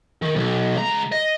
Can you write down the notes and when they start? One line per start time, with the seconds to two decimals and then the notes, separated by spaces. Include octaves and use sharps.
0.22 D#3
0.36 B1
0.77 C#2 A#5
1.12 D#5